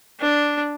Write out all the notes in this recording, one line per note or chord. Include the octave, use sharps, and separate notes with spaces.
D4